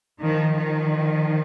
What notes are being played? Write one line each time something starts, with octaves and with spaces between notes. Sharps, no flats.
D#3 F3
D#3 F3